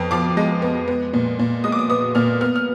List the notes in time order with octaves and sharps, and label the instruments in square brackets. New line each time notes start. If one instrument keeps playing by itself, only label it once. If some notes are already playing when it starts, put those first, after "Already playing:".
Already playing: [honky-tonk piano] F2 B3
F3 D6
G#3
B3
B3
A#2
A#2
G#3 D#6
D6
D#6
B3 D#6
A#2 F6
B3 F6
F6